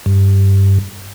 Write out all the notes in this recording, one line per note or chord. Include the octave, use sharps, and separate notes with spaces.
G2